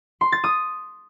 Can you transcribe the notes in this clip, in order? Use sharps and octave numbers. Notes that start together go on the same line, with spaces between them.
C6
A6
D#6